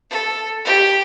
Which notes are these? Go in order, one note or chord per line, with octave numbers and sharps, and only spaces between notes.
A4
G4